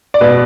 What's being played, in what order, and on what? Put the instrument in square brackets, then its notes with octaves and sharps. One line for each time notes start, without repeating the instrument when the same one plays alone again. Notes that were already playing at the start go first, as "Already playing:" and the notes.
[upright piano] D5
[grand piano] B2 [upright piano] B4